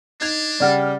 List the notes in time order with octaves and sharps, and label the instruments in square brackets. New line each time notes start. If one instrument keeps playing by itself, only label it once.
[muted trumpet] D4 [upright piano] D#4 G#6 F7
[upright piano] C#3 F6 A6 [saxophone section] G3 [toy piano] D5 F#5